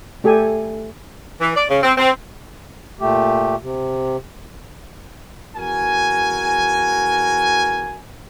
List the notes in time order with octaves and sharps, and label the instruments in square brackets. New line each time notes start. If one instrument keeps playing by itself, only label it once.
[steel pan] A3 G4 A4 G#5
[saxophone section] E3
D5
C#3
C4
C4
[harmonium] A#2 A3 G4
C3
[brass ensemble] E2 F#4 A#4 G#5